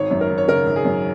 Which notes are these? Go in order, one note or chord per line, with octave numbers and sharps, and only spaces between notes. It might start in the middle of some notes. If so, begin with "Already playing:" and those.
Already playing: G#1 C#5
F#2
A#4
G#1
C#5
C#3 A#4
G#1
G#4
F#2